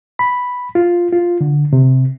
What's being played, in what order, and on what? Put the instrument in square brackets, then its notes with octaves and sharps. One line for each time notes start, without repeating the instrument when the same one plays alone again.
[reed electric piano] B5
F4
F4
D3
C3